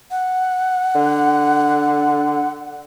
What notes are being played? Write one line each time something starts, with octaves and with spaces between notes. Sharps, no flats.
F#5
D3